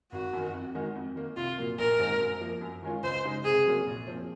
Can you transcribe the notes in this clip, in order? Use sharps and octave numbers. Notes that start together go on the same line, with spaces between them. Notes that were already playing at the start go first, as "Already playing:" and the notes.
G#1 F#4
F#2 D#3
F2
D#3 G#3 D#4 F#4
F2
D#3 A#3
C2 F4
A#2 F#3 A#3
A#1 A#4
G#2 D#3 G#3 C4
F#2
F3 A#3
F#2
D#3 G#3 C#4 F4
C#2 C5
C#3 G#3 D#4
C2 G#4
C3 F#3 A#3 C#4
A#1
A#2 F3 C4